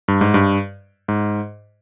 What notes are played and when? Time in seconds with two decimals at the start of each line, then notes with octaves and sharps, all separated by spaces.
0.08 G2
0.21 G#2
0.34 G2
1.08 G#2